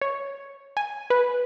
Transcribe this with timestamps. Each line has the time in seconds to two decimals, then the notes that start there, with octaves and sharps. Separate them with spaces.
0.01 C#5
0.77 G#5
1.10 B4